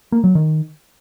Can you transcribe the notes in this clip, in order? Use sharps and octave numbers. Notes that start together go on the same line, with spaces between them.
A#3
F#3
D#3